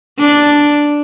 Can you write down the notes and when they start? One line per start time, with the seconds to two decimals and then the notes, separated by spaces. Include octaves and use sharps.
0.19 D4